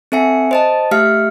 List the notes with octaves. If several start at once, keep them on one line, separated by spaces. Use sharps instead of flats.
C4 A4 E5 G#5 C#7
C5 D#5 A5
A3 G4 E5 F5 F6 C#7